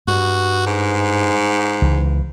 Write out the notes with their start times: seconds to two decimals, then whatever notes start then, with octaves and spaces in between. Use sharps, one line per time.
0.08 G2 F#4
0.66 G#2
1.82 C#2 E3